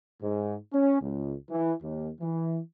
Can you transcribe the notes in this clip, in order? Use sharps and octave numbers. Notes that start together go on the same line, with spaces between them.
G#2
C#4
C#2
E3
D#2
E3